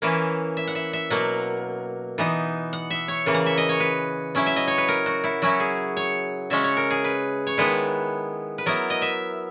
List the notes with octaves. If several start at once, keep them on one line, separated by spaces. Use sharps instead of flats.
E3 A#3 C#4 E4
E5
F#5
E5
E5
B2 F#3 A#3 F#5
E3 B3 D#4
F#5
E5
C#5
C#3 E3 A#3
F#5
E5
D#5
C#5
B4
F#3 C#4 E4
E5
D#5
C#5
B4
A#4
F#4
E4
F#3 C#4 E4 F#4
G#4
C#5
C#3 G#3 C#4 E5
C#5
A#4
G#4
B4
C#5
D#3 G#3 B3 E4 B4
B4
F#3 B3 E4 A#4
D#5
E5